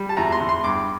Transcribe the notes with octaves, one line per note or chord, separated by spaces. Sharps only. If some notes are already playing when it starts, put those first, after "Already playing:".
Already playing: G3
A5
E2 A#5
C6
E2
C6
G2 D6